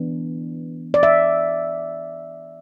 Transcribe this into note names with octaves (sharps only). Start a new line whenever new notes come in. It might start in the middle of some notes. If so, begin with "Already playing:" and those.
Already playing: E3 B3 D4
D5
E5